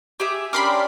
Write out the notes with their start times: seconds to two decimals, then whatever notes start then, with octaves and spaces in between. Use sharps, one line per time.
0.20 G4 G#4 E5
0.53 C#4 D4 G4 A#4 B5 C6 D6